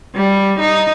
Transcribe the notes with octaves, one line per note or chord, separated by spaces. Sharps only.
G3
D#4